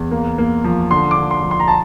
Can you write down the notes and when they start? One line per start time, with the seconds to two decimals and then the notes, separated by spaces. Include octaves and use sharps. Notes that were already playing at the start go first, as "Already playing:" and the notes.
Already playing: E2
0.11 A#3
0.38 A#3
0.64 F3
0.91 D3 C6
1.11 D6
1.17 D3
1.31 C6
1.44 F3
1.51 C6
1.60 A#5
1.68 A5